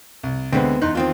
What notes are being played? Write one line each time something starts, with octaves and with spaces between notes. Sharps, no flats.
C2
D2 D3 G#3 B3 C4
E2 D#4 C6 F#6
D#3 C4 F4